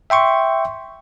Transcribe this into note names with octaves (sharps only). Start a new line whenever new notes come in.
E5 G5 C6 C#6